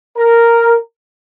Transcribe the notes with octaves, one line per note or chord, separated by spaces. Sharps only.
A#4